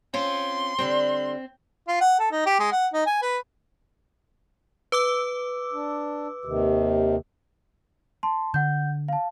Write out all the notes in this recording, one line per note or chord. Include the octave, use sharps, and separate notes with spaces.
C4 C#4 F4 C6
D3 G3 C4 G5
F4
F#5
A4
D#4
G4
G#3
F#5
D#4
G#5
B4
B4 D6 E6
D4
D#2 C3 D#3
A5 C6
D3 F#5 G6
F5 A5